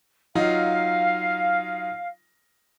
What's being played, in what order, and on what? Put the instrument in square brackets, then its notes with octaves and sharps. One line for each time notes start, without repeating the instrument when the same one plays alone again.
[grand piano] F#3 D#4 F4 [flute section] F5